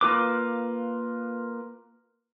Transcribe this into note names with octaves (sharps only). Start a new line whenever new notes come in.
A#3 F4 B4 D6